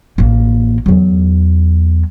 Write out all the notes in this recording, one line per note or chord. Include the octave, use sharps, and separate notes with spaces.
A1 A#3
E2 F#3